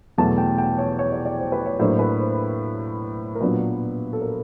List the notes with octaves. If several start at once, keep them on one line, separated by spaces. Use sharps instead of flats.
E2 B2 F#3 A3 A5
G5
G5
C#5
C#5
D5
D5
C5
B4
C#5
A2 F#3 A#3 D4 C5
B4
C5
A#4
A#2 F#3 B3 D4 B4
A4
A#4